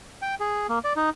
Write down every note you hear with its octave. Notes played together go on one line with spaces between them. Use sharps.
G5
G#4
A#3
D5
D#4